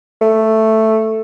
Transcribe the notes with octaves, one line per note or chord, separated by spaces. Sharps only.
A3